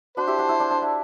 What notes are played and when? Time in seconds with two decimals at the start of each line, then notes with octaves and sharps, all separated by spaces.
0.17 D4 F#4 C5
0.27 E4 G4
0.39 D4 F#4
0.49 E4
0.60 D4
0.70 D4
0.82 E4